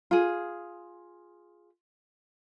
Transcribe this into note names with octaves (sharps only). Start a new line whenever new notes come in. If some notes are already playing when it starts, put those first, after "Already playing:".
F4 G#4